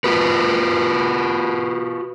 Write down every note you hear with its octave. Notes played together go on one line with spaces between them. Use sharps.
F4 F#4 B4